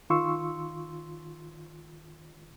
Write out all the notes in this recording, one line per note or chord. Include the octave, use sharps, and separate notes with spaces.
D#3 F4 C6 C#6 E6